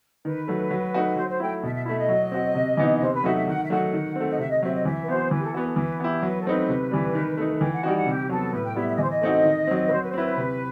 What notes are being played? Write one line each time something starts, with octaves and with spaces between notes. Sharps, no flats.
D#3 B4
F#3 A3
F#3
A3 D#4 F#4
F#3 C5
C5
A3 E4 G5
B2 E5
E5
A3 E4 E5
D#5
F#3
C4 F#4
C3
E3 B3 D#4
C3 C5
B4
F#3 A3 D#4 F#4 E5
E5
D#3 F#5
E5
F#3 A3 D#4 F#4 F#5
D#3
A3 C4
D#5
C3 E5
D#5
F#3 C4 E5
D#5
E3 E5
B4
B3 F#4 C5
E3 B4
G4
A4
B3 F#4 B4
A4
E3 B4
B3 E4 G4
F#3 B4
A4
A3 C4 D#4 B4
C3
E3 G3
D#3
A3 D#4
E3 G5
F#5
G3 D#4 F#4 G5
F#5
C3 G4
F#3 B3 A4
A2 B4
G5
G3 B3 E4 E5
E5
D#5
E3 C5
D#5
A3 C4 D#4 F#4
D#3
F#3 C4
B4
F#3 C5
B4
C5
C4 E4 B4
B4
C3